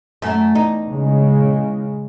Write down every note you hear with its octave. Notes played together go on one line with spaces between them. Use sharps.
F#2 A3
E2 D#4
C#3 G#3